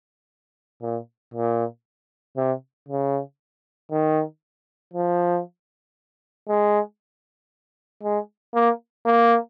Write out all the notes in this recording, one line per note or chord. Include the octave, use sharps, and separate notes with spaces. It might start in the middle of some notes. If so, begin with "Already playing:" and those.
A#2
A#2
C3
C#3
D#3
F3
G#3
G#3
A#3
A#3